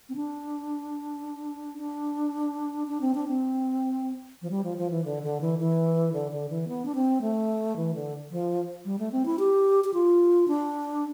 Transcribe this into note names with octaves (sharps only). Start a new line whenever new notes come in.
C4
D4
D4
D4
C4
D4
C4
F3
G3
F3
F3
E3
D3
D3
E3
E3
D3
D3
E3
B3
D4
C4
A3
E3
D3
F3
G3
A3
C4
E4
G4
G4
F4
D4